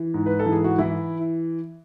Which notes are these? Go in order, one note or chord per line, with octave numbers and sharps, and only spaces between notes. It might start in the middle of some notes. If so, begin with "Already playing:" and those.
Already playing: E3
G#2
B4
A4
E3
G#4
F#4
E3 E4